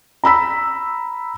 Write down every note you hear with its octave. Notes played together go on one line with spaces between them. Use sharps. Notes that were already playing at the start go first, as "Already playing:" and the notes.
A#5 B5 E6 B6